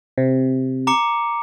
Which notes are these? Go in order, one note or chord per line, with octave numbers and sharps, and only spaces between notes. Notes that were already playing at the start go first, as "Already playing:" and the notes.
C3
A#5 D6 C#7